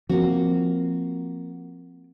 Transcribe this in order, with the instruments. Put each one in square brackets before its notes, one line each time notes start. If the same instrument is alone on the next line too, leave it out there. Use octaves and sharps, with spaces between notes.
[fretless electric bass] F3 C4 [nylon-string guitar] A#3 F#4